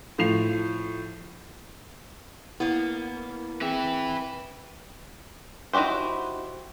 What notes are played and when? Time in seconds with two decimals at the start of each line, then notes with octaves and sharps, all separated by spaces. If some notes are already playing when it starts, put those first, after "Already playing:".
0.18 A2 F3 C7 F7
2.60 A#3 B3 E4
3.62 C4 G#4 B4 E5 G5
5.73 D#4 E4 F#4 G4 C5